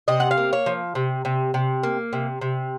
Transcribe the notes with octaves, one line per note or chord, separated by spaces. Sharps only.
C3 D#5
F#5
F5
A#3
C#5
F3
C3
C3
C3
A#3
C3
C3